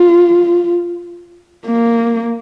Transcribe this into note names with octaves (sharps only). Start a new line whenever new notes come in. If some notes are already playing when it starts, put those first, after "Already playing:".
Already playing: F4
A#3